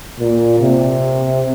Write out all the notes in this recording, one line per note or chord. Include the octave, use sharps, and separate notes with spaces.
A#2
C3